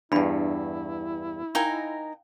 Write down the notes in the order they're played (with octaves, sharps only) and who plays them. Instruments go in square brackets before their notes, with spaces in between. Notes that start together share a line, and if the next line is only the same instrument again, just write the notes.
[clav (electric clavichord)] E2 G2 [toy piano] D4 B5 [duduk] E4
[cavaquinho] D#4 A#4 G#5 [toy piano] F5 G5